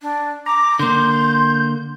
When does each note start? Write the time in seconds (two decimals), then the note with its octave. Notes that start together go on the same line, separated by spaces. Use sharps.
0.02 D4
0.46 A#5 D6
0.79 D3 A#3 C6 G6